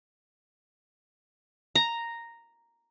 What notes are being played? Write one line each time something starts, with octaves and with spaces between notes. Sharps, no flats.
A#5